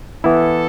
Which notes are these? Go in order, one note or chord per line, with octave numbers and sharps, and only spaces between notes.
E3 B3 E4 A4